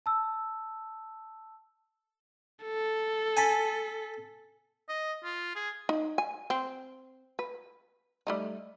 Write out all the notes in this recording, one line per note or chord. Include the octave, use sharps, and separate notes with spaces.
A5 E6
A4
G#5 A5 B5
D#5
F4
G#4
D#4
G#5
C4
B4
G3 A3 D#4